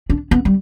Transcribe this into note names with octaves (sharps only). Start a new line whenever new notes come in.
D4
B3
G3